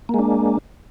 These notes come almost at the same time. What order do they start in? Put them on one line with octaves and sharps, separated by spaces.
A#3 G#3 D4